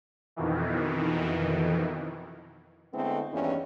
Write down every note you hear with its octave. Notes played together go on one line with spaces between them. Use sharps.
F2 B2 D#3 E3
D3 G#3 A3 B3 C4 E4
E2 G2 D#3 E3 A#3 C#4